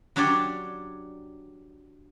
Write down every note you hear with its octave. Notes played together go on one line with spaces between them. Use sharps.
F#3 D4 G4 C#5 D5